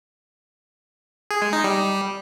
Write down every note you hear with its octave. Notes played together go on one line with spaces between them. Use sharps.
G#4
G#3
D#4
G3